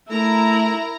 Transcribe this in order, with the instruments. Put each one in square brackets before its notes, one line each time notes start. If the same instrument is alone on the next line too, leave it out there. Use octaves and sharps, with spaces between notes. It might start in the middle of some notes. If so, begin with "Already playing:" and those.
[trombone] A3 [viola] E4 [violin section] A#4 A#5